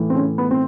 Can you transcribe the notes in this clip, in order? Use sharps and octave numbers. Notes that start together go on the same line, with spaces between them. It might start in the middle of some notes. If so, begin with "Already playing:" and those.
Already playing: A2 E3
C4
C#3 C#4
B3
C4